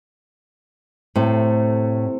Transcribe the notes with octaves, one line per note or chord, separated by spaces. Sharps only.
A2 C3 A3